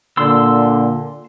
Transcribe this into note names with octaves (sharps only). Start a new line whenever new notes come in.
A#2 D3 C6 E6